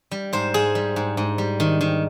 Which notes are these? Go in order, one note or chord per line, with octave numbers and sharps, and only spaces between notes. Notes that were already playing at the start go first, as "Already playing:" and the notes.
G3
G#2 C5
G#2 G#4
G3
G#2
G#2
G3
D#3
D#3